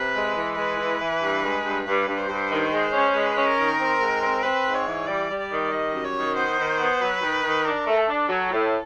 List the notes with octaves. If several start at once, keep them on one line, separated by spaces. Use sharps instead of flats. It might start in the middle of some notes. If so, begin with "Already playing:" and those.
Already playing: C3 B4
G#3
E3
G#3 B4
E3
E3
G2
G#3
G2
G2 B4
G2
C5
G2
D#3
G#3
C#4
G#3 B4
C#4
A#4
D#3
C4
G#2
C4
C4 B4
G#2
C#5
E3
G3 D5
G3
D5
D#3
G3 D#5
F#2
C#5
D#3
B3 C5
D#3
B3
F#3 B4
D#3
D#3
D4 A#4
A3
A4
D4
F#3
A2